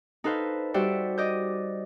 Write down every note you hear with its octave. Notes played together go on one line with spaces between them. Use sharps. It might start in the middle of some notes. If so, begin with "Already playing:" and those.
D#4 A4 B4 C5 F5
G3 F#4 G4 C5 D5 E5
D5 D#5 G6